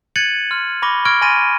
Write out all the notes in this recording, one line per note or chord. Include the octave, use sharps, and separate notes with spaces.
F#6 G#6 A6 C#7 D#7 F#7
C6 F6
B5 C#6 D6 A#6 G7
C#6 F6 G#6 A#6 D7 G7
G#5 B5 C6 A6 A#6 D#7